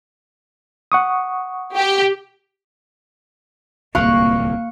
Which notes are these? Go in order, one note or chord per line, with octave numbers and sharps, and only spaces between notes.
F#5 C#6 D#6
G4
D1 C2 A#2 A#3 F5 C#6 F#6